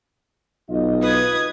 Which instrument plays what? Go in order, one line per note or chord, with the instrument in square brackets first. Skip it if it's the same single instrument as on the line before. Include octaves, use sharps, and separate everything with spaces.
[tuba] B1 [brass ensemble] F4 D#5
[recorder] B4 [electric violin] D#6 G#6